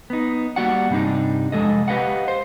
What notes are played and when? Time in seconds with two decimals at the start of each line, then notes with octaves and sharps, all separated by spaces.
0.10 B3 D#4
0.56 G3 A#3 F#4 D5 F#5
0.90 G2 C3 G3 D4 D#4
1.52 C2 F2 A#2 G#3 A4 D#5
1.88 G4 G#4 B4 D#5 F5 F#5
2.28 C5